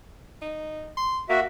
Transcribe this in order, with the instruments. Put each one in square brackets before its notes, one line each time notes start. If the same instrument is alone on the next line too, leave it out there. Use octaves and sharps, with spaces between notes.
[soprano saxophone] D#4
C6
[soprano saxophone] A#3 [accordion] F#4 E5